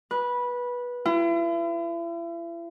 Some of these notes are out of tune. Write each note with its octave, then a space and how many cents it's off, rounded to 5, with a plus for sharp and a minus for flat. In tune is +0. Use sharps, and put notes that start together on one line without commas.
B4 -15
E4 +40